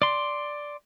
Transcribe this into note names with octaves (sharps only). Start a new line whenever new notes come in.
D5 C6